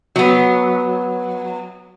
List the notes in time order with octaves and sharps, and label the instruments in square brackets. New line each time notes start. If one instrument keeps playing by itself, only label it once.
[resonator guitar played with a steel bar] F#3 B3